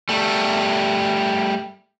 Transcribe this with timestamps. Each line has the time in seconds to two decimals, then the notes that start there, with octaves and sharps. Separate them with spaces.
0.09 G3 A3